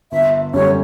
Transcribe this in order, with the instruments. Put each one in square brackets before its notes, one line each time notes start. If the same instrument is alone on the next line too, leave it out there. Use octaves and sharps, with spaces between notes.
[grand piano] G1 [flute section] E5
[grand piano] F#2 D3 G3 [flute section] C#5